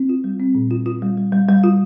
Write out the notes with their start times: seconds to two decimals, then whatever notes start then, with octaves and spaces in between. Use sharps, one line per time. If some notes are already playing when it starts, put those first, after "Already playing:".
Already playing: C4
0.09 F4
0.24 G3
0.39 C4
0.55 A#2
0.71 F4
0.86 F4
1.02 G3
1.18 G3
1.32 G3
1.49 G3
1.64 F4